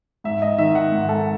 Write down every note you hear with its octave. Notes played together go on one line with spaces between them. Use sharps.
G#2 E5
D#5
D#3 E5
F#5
G#2
A4